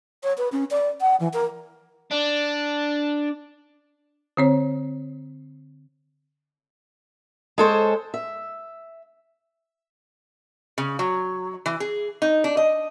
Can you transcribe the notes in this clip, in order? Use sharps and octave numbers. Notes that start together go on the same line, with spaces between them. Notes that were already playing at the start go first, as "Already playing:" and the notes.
C#5
B4
C#4
D5
F#5
E3
A#4
D4
D3 C4 C#5
G#3 A4 C5 C#5
E5
C#3
F#3
E3
G#4
D#4
D4
D#5